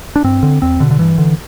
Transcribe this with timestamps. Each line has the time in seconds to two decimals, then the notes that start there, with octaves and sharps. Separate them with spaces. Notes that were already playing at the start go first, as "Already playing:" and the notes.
0.16 D4
0.24 G2 C4
0.43 D3
0.62 E2 C4
0.80 B2 D3
0.91 D3
0.99 G2 E3
1.18 D3